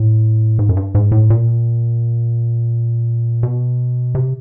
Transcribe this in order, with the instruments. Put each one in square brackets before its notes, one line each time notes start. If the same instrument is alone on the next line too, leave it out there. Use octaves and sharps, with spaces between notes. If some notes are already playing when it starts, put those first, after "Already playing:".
Already playing: [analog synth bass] A2
G#2
F#2
G2
G#2
A2
A#2
B2
C3